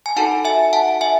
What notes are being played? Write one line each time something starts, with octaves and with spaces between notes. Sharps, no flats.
G#5
D#4 F#4 A4 F#5 A5
E5 G#5
F#5 A5
E5 G#5